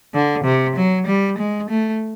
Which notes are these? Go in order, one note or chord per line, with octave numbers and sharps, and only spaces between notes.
D3
C3
F#3
G3
G#3
A3